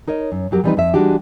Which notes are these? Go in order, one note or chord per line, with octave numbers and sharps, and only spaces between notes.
D#4 A#4 C#5 D#5
F#2
F2 F#3 G4 A#4
E3 F3 G3 C4 D#4 B4
F2 E5
E3 G3 G#3 D4 F#4 G4